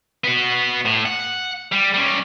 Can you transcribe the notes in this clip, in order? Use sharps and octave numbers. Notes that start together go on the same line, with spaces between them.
B3 F#4
A2
F#5
G3
G3 C#4